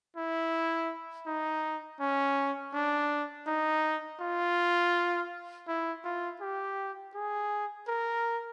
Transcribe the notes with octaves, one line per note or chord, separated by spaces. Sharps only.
E4
D#4
C#4
D4
D#4
F4
E4
F4
G4
G#4
A#4